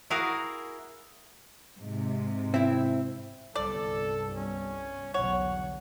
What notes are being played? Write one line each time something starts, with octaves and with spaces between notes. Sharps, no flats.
E4 F#4 G#4 A#4 F5
G#2 C3
C4 E4 E5
G1 C2 G2 A4 D5
C#4
B1 E2 D3 C#5 F#5